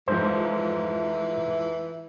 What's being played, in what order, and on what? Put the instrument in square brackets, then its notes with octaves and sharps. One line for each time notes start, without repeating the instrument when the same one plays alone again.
[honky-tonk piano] F1 G#2 F3 [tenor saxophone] E3 [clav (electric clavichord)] C5